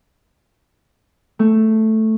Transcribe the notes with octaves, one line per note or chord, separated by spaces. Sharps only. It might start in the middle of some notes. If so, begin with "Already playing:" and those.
A3